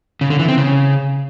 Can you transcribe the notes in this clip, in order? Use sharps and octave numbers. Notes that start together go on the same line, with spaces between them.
C#3
D3
E3
C4
C#3